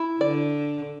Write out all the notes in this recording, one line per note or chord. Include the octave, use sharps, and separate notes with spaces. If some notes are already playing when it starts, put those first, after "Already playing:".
Already playing: E4
D3 D5